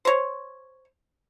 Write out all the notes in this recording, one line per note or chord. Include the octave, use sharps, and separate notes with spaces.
C5 C#5